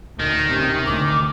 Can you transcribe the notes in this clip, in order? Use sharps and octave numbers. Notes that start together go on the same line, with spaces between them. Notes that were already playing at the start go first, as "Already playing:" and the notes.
D2 D#3
C3 C#4
D2 D6